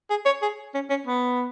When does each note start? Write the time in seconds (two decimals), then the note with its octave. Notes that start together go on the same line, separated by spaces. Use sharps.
0.10 G#4
0.26 C#5
0.42 G#4
0.74 C#4
0.90 C#4
1.07 B3